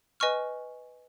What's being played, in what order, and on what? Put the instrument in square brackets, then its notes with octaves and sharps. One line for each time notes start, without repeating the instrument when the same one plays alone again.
[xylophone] B4 D#5 G#5 C#6 F6